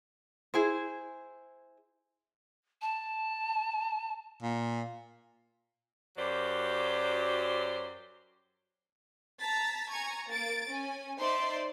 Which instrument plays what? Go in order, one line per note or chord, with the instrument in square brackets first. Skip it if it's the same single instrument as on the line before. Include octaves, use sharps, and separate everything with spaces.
[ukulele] E4 G#4 C5
[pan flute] A5
[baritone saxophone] A#2
[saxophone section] F#2 F#3 G4 C5 D5
[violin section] A5 A#5 A6 B6
G#5 A#5 C#6 G#6
A#3 A6 D7
C#4 G#5
D#4 C5 D5 E5 C6